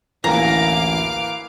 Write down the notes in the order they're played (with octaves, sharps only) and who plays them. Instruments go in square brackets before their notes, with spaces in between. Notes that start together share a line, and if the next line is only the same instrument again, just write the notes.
[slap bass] A1 D2 A2 [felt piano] E3 A#3 [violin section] F5 D6 [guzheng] A#5